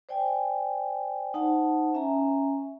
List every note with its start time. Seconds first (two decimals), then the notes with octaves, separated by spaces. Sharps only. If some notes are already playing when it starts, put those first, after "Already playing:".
0.09 C5 D5 G5 G#5
1.34 D#4 C5 F#5 A5
1.94 C#4 E5 G#5 A#5